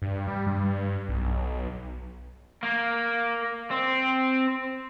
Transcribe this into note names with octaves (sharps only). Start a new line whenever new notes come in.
G2
G3
G2
G2
B1
A#3
C4